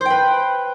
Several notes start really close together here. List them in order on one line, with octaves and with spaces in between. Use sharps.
C5 G5 B4